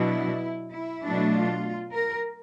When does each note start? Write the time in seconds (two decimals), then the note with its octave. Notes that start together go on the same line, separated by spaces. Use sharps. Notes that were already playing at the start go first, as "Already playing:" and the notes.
Already playing: B2 F#3 B3 D4 E4
0.74 E4
1.03 B2 F#3 A3 D4
1.33 F4
1.92 A#4